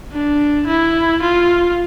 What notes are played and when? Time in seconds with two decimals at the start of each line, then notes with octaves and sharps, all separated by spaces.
0.13 D4
0.67 E4
1.22 F4